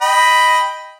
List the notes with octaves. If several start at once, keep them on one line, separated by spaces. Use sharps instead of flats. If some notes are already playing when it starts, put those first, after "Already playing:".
D#5 G5 B5